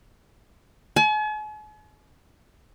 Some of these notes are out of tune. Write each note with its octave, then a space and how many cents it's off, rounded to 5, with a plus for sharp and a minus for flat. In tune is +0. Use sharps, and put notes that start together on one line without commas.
G#5 +45